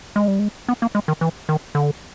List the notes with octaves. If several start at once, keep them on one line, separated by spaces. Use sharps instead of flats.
G#3
G3
G#3
B3
A#3
G#3
D#3
E3
D#3
D3